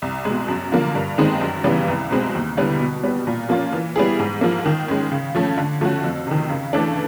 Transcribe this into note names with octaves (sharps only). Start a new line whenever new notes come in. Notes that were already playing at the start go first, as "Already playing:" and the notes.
C2
B2 G#3
F#2
D3 F3 A#3
G2
D#3 G#3 C4 D#4
F#2
C#3 E3 G3 B3
C2
B2 G#3 C4
D#2
D3 G3 B3 E4
B2
G3 B3
A#2
F3 A#3 C#4 F4
E3
G3 B3 E4 G#4
G#2
F3 A#3
D#3
G#3 C#4
C#3
F3 A3 C#4
D3
F3 A3 C#4 F#4
F2
C3 D#3
C#3
E3 A3 D4